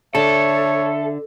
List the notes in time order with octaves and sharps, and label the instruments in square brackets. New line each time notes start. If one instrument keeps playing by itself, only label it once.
[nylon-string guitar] D3 [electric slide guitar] A4 [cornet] C#5 [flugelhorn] E5